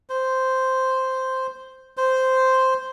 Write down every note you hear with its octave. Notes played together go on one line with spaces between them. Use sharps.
C5
C5